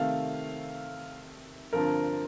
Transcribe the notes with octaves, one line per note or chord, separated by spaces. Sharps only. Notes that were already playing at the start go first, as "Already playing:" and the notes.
Already playing: C3 D#3 A3 F5
G2 D3 F3 C4 A#4